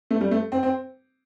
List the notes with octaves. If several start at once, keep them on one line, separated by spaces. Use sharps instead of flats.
A3
G3
A3
C4
C4